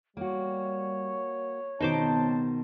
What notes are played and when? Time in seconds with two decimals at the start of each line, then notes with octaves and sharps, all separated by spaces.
0.17 G3 A#3 F#4 C#5
1.80 C#2 B2 D#3 C4 D#4 C5 A5 D6